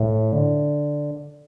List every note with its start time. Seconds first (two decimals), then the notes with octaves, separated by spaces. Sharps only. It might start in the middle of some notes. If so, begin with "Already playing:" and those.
Already playing: A2
0.32 D3